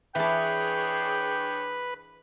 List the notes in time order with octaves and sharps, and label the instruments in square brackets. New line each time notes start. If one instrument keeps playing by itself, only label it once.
[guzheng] E3 A5 [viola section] D4 G#4 C#5 [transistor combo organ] B4 [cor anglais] G5